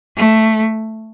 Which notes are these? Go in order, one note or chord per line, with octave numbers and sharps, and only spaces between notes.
A3